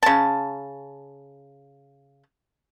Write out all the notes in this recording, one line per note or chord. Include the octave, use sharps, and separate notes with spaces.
C#3 A5